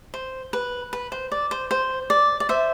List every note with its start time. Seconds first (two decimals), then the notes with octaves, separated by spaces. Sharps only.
0.14 C5
0.53 B4
0.93 B4
1.12 C5
1.32 D5
1.51 C5
1.71 C5
2.10 D5
2.40 D5
2.49 C5 E5